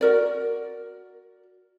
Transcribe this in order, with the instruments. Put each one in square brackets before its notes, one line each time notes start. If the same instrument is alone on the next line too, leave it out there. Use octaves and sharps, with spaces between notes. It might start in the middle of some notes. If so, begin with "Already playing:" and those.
[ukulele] F#4 A#4 D5